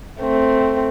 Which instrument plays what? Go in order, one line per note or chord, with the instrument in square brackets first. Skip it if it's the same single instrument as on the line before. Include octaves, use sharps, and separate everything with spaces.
[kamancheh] A3 C4